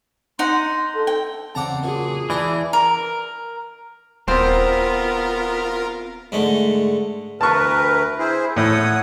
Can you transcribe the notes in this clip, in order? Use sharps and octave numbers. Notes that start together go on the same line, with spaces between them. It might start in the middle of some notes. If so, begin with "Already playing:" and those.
D#4 F#5 C6
A4
G5
E2 C#3 C4 D5 F#5 A5 A#5
A#2 F#3 G#4
E3 D4 E4 D5 A#5
A#4
D#1 B3 C4 F4 A#4 C5
G#2 D3 A3
D2 A#4 B4 A5 C#6
E4 G#4 C5
A2 C#5 F#5 D#6